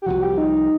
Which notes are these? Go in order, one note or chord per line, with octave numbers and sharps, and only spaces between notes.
G4
C2 C3 F3 F#4
G4
D#4